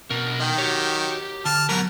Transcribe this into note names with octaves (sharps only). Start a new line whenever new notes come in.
B2 D4 A#4
D#3 D#5 G5
F#4 G4 C#5
D3 A5 F6
G#2 B2 F#3 A#4